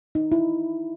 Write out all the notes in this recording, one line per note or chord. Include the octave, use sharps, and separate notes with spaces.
D#4
E4